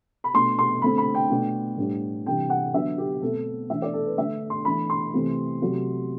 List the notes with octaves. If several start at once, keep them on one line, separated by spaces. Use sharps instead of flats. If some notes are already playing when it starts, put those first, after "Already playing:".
B5
B2 A3 D4 C6
C6
D3 A3 C4 B5
B5
G5
B2 A3 D4
A2 G3 B3 D4
C3 E3 G3 D4 G5
F#5
D3 F#3 B3 D4 E5
G4
B2 A3 C4 A4
E3 A3 D4 E5
D5
A4
B4
D3 A3 D4 E5
C6
E3 A3 D4 B5
C6
C3 E3 A3 C4
C3 F#3 A3